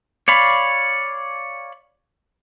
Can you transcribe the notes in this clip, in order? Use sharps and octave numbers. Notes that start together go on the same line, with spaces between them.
C#5 D5 F5 B5